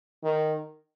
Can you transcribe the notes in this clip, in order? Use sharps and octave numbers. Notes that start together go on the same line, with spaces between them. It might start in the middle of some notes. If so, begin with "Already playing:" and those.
D#3